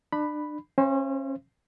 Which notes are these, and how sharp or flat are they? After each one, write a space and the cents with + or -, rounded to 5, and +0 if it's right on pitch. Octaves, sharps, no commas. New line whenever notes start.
D4 +30 B5 +0
C#4 -30 C5 +0 F5 -45